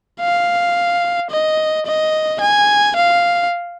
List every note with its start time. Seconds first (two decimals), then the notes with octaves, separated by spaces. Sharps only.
0.21 F5
1.30 D#5
1.86 D#5
2.41 G#5
2.96 F5